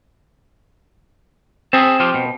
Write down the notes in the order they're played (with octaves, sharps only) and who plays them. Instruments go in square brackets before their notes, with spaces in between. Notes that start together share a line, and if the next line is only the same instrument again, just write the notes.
[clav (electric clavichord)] C4 [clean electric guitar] G#4 E5 A5
[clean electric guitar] F3 F4 G4
B2